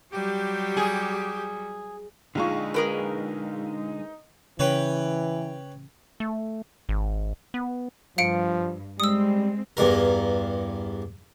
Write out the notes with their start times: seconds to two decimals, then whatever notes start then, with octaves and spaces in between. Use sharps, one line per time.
0.13 F#3 G3 G4
0.77 G#4
2.35 A#1 D3 G#3 D#4 F4 C#6
2.74 G#4 A#4 B4
4.59 C#3 E3 B4 C#5 G5
6.20 A3
6.89 G#1
7.54 B3
8.18 G2 F3 F5 C#7 D7
9.00 G3 G#3 C4 D#6 E6
9.77 E2 G2 A#4